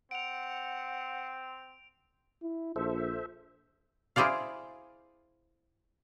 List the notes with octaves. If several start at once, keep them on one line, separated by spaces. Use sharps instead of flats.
C4 F#5 D7 F7
E4
A#1 A4 C5 E5
E4 G#4 C5 D5 F5